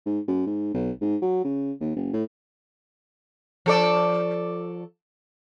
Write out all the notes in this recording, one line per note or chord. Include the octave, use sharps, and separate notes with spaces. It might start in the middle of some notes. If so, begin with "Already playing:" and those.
G#2
F#2
G#2
B1
G#2
F#3
C#3
D#2
F#1
A2
F3 A4 D5